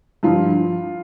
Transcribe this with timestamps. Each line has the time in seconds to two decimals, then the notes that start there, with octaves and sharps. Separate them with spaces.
0.23 G2 F3 F4